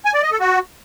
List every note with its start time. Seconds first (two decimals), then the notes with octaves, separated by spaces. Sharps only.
0.05 G#5
0.14 D5
0.23 D#5
0.31 A4
0.40 F#4